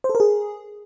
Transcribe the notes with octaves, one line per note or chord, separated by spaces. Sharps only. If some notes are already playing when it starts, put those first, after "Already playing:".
C5
A4
A#4
G#4